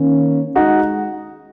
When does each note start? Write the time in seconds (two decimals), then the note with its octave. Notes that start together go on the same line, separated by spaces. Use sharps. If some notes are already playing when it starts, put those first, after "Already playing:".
Already playing: D#3 A#3 C#4
0.55 G#3 D#4 F#4